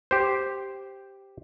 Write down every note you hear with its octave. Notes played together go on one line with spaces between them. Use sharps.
G4 C5